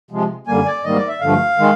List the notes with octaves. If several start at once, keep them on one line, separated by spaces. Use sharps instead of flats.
C3 F3 G#3
F#2 D3 G3 A#3 G#5
D5
G#2 D#3 G3 A#3 D#5
D5
E5
G2 D3 F3 A3 F5
D#3 G#3